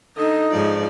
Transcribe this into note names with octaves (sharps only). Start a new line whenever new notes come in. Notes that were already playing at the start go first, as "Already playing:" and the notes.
D3 D#4 D#5
G#2 C#3 F3 D5